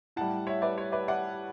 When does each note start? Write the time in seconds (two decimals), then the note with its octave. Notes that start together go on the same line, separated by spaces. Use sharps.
0.16 A2 G3 F#5 A5
0.47 C#5 E5
0.62 B4 D5
0.78 C#5
0.92 B4 D5
1.08 D5 F#5